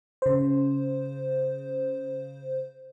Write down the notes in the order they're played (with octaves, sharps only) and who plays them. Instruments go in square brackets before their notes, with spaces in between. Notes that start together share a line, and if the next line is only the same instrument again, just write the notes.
[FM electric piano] C#3 C5